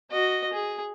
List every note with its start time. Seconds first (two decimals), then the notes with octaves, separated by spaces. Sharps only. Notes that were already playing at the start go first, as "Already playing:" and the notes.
0.11 F#4 D#5
0.53 G#4